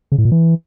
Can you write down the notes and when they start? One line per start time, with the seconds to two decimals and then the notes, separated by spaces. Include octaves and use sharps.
0.12 C#3
0.18 A2
0.25 A#2
0.32 E3